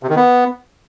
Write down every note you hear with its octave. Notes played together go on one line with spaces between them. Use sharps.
C3
D#3
B3